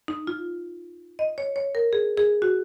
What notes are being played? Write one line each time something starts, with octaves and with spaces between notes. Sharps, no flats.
D#4
F4
D#5
C#5
C#5
A#4
G#4
G#4
F#4